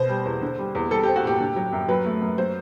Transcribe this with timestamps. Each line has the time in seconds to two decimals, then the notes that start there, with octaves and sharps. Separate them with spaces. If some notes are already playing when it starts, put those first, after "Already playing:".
Already playing: B2 C5
0.09 G3
0.26 E2
0.41 D3
0.59 G3
0.75 E2
0.91 G3 A4
1.04 C4 G4
1.16 F#4
1.23 A2 G4
1.40 D3
1.56 F#3
1.73 F#2
1.88 F#3 B4
2.05 A3
2.22 F#2
2.38 F#3 C5